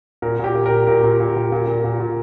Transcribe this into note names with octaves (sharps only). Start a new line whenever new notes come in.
A#2 A#4
A#2 G4
A#2
A#2 A#4
A#2 A#4
A#2
A#2
A#2
A#2
A#2
A#2
A#2